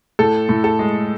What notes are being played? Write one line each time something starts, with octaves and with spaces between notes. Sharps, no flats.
A2 A4
A2
A4
G#3